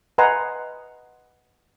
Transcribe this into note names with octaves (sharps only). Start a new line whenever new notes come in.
B4 D#5 F#5 G#5 A#5 C6